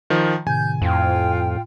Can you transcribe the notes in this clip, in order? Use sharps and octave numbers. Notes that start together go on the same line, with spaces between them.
D#3 F3
A2 C3 D#3 G#5 G6
F2 A2 F4 G5